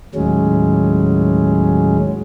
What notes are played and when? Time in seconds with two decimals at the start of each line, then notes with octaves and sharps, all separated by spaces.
0.15 D#2 A2 F#3 G#3 C#4